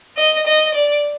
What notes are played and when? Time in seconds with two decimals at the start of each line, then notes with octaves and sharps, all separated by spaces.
0.17 D#5
0.46 D#5
0.74 D5